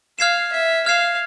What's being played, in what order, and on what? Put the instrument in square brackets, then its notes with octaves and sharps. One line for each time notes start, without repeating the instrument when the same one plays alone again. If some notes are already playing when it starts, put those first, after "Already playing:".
[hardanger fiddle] F5 [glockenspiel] F6 G#6 C7 E7
[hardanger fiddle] E5
[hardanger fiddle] F5 [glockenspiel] F6 G#6 C7 E7